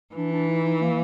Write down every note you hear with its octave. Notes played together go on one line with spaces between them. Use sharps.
E3 D4
D4
D#4
D#4
A#3